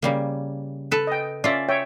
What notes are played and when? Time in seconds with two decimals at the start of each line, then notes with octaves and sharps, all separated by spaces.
0.02 C#3 G3 A#3
0.91 A4 B4
1.07 D#5 G5
1.44 C#4 F4 D5 E5
1.69 C#5 E5 G5